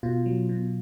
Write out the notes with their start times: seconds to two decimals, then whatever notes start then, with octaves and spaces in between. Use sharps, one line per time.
0.03 B2 F4
0.26 F#3
0.49 B2